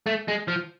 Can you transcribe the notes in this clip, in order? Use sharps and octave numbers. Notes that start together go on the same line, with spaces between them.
A3
G#3
F3